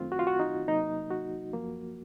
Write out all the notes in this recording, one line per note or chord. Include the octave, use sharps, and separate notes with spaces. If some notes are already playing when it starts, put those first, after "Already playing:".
Already playing: F#2 D#3 A3 C4 F4
F#4
F4
F#4
D#4
C3 F#3 A#3 D#4
F#4
F#2 F3 A#3